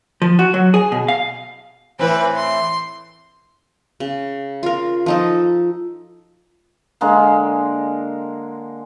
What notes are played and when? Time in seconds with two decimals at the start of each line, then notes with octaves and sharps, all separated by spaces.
0.22 F3
0.39 F#4
0.54 F#3
0.74 G#4
0.92 B2
1.08 F5
1.99 A2 E3 C4 B4 G#5
2.36 C6
4.00 C#3
4.63 F4 A#4
5.06 F3 D#4 A4
7.01 D3 G#3 A#3